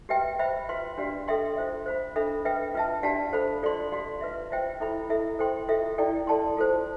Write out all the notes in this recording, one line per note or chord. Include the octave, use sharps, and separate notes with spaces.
G4 B4 E5 G5
C5 E5 B5
F4 B4 F5 C6
D4 G4 B4 D5 F5
A4 E5 G5 C6
F4 C5 E5
C5 F5 B5
D4 A4 E5 B5
B4 E5 G5
F4 B4 E5 A5
D4 G4 D5 F5 A5
A4 C5 F5 B5
F4 A4 D5 F5 C6
G4 D5 F5 C6
F4 B4 E5
F4 C5 E5 G5
E4 A4 E5 B5
E4 A4 E5
A4 C5 G5 C6
F4 A4 E5
E4 A4 D5 G5
A4 D5 A5 C6
F4 A4 C5